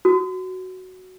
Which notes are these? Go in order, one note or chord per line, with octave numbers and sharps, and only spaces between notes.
F#4